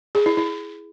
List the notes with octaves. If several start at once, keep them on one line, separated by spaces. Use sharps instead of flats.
G#4
E4
E4